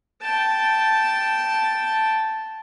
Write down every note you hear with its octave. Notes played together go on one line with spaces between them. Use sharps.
G5 A5